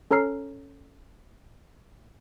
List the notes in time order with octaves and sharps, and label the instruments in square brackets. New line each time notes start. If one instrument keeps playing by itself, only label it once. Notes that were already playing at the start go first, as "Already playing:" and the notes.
[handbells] C#4 A4 C#5 A#5 F6 C7